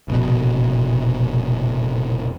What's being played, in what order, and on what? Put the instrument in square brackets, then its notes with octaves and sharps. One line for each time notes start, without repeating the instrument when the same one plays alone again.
[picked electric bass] F1 A#1 B2